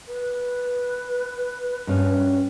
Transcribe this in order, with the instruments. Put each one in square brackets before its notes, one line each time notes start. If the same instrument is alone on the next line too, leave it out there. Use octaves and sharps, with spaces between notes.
[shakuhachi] B4
[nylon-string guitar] G2 C#4